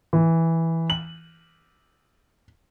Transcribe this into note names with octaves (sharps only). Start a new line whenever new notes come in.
E3
F#7